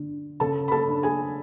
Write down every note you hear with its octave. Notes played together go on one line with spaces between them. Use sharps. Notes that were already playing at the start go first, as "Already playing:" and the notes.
Already playing: D3
C#3 A4 A5
B5
A4 A5
D4
G#4 G#5